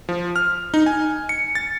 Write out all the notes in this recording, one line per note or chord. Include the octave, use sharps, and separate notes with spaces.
F3
F6
D#4
G#5
C#7
A6